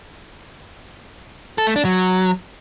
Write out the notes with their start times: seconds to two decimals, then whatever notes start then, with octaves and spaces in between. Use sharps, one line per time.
1.58 A4
1.67 A3
1.76 D4
1.85 F#3